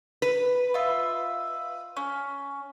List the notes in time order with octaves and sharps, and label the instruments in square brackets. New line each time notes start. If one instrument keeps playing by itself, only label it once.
[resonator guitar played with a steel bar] B4
[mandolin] F4 D#5 E5
C#4